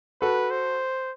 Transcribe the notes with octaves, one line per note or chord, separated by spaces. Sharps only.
F#4 A4 B4
C5